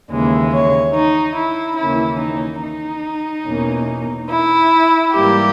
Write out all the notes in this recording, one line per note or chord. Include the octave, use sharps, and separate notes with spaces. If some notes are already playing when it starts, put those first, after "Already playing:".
D#2 C#3 E3 G#3
C#5
D#4
E4
D#2 C#3 E3 A#3 C#4 E4
D#4
D#4
E2 B2 A#3 C#4
E4
G#2 E3 G3 A#3 G4